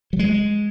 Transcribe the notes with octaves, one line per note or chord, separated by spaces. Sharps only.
F#3
G#3